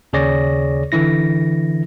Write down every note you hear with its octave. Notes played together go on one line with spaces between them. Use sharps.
D#2 C#3 G#4 C#5 D5 A#6
D3 E3 E4 A#6